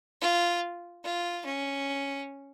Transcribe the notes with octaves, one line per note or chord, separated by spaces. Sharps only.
F4
F4
C#4